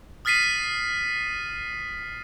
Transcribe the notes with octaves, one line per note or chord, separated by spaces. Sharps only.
D#6 F6 A6 B6 C7 D#7